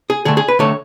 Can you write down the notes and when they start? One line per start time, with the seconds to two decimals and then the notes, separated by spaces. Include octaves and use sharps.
0.10 G#4
0.25 D3 A3 G#4
0.37 G#4
0.48 B4
0.59 D3 A3 C#5